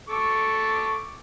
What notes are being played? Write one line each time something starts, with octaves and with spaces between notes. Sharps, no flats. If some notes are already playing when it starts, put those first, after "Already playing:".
A4 C#6 D6